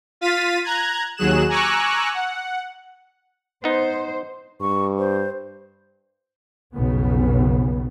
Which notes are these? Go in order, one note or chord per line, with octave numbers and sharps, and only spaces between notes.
F4 F5 A6 B6 D#7
A#5 F#6 G#6
D#2 F#3 G#4 F#6 E7
G#5 A#5 C#6 D6 E6 F#6
F#5
B3 D#4 C5
G2 C#6
C5
B1 F2 C#3 B3